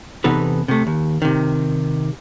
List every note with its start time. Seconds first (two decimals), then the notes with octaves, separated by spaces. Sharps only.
0.24 E2 C3 B3 D#4 A4 B4
0.68 C3 A3
0.87 D#2
1.22 C3 D#3